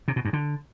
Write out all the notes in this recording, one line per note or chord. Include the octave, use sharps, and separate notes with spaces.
C3
B2
G2
D3